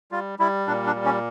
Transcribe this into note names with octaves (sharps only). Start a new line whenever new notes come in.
G3 F4
G3 E4
A#2 D4
D4
G3
C#4